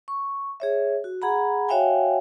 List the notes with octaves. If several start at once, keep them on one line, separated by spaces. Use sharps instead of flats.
C#6
G#4 C#5 E5
F#4
G#4 F#5 A#5 B5
F#4 C#5 E5 F5 G5 G#5